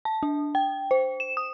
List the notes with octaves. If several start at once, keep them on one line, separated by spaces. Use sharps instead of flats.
A5
D4
G5
C5
E7
D#6